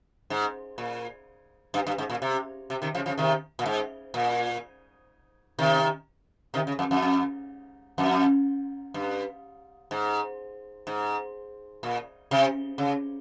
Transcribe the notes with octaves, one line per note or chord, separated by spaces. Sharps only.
G#2
A#2
G2
G2
G#2
A#2
C3
C3
C3 D#3
C#3 F3
C#3 F3
C3 D#3
A#2
G#2
A#2
C3 D#3
C3 D#3
C#3
F2
F2
F2
G2
G#2
G#2
A#2
C3
C#3